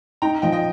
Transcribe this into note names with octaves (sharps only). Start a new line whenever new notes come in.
D#4 G5 A#5
F3 D#5 G5
D#5 G5